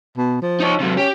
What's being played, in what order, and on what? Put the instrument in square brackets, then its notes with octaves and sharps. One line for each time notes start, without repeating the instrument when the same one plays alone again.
[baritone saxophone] B2
F3
[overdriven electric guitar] D#4 C#5
C3 F#3
[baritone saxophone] C#4 [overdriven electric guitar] G4